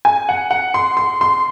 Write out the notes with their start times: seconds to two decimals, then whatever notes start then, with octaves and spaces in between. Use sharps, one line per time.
0.05 G#5
0.29 F#5
0.51 F#5
0.74 C6
0.97 C6
1.21 C6